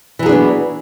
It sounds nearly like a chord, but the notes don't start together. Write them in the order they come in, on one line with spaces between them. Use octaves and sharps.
E3 F#3 G#4 D4 B3